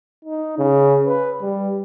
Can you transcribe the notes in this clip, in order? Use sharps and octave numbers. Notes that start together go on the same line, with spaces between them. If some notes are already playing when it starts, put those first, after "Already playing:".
D#4
C#3
B4
G3